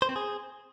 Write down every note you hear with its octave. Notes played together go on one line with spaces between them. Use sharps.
C5
C4
G#4